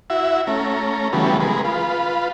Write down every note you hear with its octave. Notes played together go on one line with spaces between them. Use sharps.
E4 F#4 E5
A3 C#4 A#5
C#3 E3 F#3 G3 A3 B3
G#3 G#4 A#4 B4
F4 B4